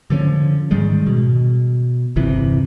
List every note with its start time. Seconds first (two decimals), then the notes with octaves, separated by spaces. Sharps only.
0.10 D3 F3 G3 C#4
0.71 G#2 D#3 G3 G#3
1.06 B2
2.16 G1 E2 C3 E3